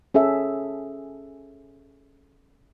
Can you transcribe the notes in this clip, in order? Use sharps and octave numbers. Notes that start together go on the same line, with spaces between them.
C#4 G#4 A4 E5